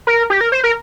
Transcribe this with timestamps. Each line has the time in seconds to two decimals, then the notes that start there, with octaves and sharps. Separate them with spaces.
0.07 A#4
0.30 G4
0.41 A#4
0.52 C5
0.64 A#4